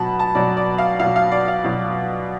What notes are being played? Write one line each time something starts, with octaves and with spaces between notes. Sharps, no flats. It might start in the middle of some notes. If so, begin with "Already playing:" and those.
Already playing: B2 F#3 A5 B5
A5
B2 F#3 D5
D5
F5
B2 F5
F#3
F5
D5
F5
B2 F#3